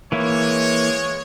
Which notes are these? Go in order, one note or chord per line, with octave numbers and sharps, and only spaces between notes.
E3 G#3 A#3 E4 C#5